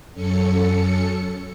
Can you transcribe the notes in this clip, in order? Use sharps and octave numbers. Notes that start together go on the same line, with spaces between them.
F#2 C#4 A4 C#7